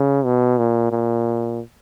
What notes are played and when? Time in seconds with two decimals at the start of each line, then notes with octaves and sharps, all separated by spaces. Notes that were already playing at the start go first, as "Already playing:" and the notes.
Already playing: C#3
0.25 B2
0.58 A#2
0.91 A#2